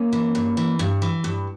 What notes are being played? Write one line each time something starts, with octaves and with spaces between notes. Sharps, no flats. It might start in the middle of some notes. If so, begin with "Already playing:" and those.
Already playing: F#2 A#3 C#4
E3
G2
E3
G2
E3
G2